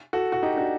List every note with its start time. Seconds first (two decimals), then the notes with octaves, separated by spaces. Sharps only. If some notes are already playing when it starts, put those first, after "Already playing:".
0.13 F#4 A4
0.32 F#4
0.43 D#4 G4
0.56 D4 F#4